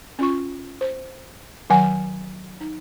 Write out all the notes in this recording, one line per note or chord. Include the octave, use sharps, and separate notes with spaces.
C#4 F4 C#6
C5
D#3 F#3 F#5 G#5
D#4